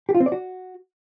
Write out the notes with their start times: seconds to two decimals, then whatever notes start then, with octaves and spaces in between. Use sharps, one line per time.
0.09 G4
0.15 F4
0.20 C4
0.26 D5
0.32 F#4